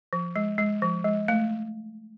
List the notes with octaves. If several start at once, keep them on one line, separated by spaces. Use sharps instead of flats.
F3
G#3
G#3
F3
G#3
A3